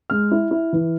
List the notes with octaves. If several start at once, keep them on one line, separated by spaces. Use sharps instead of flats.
G#3 F6
E4
E4
E3